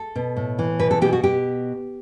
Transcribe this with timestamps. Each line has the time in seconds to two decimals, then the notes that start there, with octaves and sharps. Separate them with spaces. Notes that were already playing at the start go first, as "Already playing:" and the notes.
Already playing: A4
0.16 B2
0.37 A2
0.59 E3
0.79 B2 B4
0.91 A4
1.02 B2 G4
1.13 F#4
1.23 B2 G4